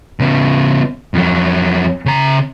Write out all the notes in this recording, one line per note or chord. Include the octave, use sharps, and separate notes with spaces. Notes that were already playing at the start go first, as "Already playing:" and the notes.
C#3 B3
F2 F#3
C#3 A#5